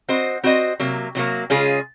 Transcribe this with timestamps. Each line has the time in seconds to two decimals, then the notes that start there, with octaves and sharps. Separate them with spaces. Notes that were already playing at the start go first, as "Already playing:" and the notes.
0.08 C4 F#4 C5 D#5
0.44 C4 F#4 C5 D#5
0.80 C3 F#3 A#3
1.15 C3 F#3 A#3
1.50 C#3 G#3 C#4 F4 G#4